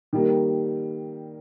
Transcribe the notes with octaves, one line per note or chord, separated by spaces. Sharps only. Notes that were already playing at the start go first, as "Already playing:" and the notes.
D#3 G3 A#3